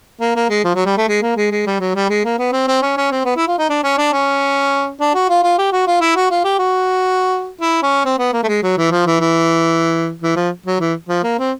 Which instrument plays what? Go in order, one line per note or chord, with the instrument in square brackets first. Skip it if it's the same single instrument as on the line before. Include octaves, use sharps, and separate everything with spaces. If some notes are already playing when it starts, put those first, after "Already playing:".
[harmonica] A#3
A#3
G#3
F3
F#3
G3
A3
G#3
A#3
G#3
G#3
G3
F#3
G3
G#3
A#3
B3
C4
C4
C#4
C#4
C4
B3
E4
F4
D#4
D4
C#4
D4
C#4
D4
F#4
F4
F4
G4
F#4
F4
E4
F#4
F4
G4
F#4
E4
C#4
C4
B3
A#3
A3
G#3
F#3
E3
F3
E3
E3
E3
F3
F#3
E3
F3
A#3
C4